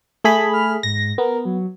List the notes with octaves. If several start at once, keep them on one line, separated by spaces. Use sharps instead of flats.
A3 G#4 A4 B5
F6
G#2 A#6
B3 A#4
F#3